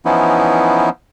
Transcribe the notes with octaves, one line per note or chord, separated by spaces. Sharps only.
E3 F3 B3 C#4 D#4 E4